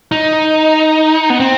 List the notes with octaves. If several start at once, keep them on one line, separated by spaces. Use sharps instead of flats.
D#4
B3
C4